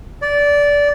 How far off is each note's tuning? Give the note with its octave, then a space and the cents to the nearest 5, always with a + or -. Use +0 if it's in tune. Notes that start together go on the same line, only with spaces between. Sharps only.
D5 -15